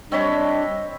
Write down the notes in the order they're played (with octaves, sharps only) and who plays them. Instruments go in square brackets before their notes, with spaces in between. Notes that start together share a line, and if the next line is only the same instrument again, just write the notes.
[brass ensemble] G3 D4 [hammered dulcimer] C4 C#5 B5 [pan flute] D#5